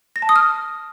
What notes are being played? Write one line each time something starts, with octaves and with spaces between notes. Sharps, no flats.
A#6
A5
D#6
F6